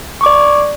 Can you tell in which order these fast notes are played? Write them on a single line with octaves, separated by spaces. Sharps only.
C#6 D6 D5